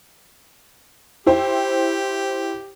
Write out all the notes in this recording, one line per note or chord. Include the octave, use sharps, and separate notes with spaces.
E4 G4 C5 G5